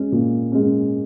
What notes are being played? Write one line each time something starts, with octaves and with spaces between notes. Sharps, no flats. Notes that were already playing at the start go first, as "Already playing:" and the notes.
Already playing: G#3 C#4
A#2
G#3 C#4